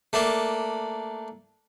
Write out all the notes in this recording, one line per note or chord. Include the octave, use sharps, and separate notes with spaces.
A3 A#3 D4